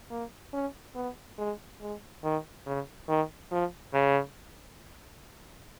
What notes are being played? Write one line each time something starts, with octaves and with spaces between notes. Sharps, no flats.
A#3
C#4
B3
G#3
G#3
D#3
C#3
D#3
F3
C#3